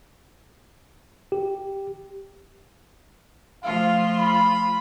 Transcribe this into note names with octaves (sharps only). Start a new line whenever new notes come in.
G4
F3 A3 F4 F5
B5